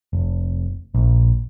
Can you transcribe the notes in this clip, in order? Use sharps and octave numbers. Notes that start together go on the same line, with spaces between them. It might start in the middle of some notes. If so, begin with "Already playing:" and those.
F1
A#1